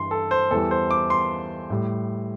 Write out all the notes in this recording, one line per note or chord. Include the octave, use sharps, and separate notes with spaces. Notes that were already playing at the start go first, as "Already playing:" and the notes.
Already playing: G2 E3 G3 C6
A4
C5
E2 E3 G3 A4
C5
D6
C6
A2 G3